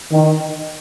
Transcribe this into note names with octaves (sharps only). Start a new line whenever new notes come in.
D#3